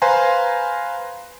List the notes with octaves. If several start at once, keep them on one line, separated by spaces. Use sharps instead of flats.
B4 C5 F5 G#5 A#5 C6